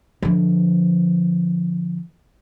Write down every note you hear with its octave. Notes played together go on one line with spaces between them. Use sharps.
D3 F3